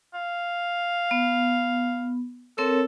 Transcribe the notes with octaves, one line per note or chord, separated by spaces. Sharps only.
F5
B3
C4 A4 A#4 C#5